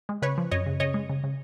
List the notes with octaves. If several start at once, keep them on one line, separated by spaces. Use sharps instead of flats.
G#3
C#3 B4 C#5
F3
F#2 C#5 D#5
C#3
C#3 C#5 D#5
G#3
C#3
C#3